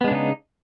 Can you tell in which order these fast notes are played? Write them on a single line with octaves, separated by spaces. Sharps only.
B3 G#3 D4 C#3 D#4